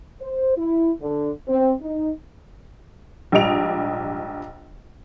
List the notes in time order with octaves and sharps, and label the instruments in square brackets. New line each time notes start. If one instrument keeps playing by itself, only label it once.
[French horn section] C5
E4
D3
C4
D#4
[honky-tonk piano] A#1 G#2 G3 D#5 D7 F7